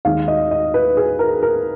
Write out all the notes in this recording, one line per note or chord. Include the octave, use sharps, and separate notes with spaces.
D#2 D#3 G#3 F5
D#5
D#5
B4
G#4
A#4
A#4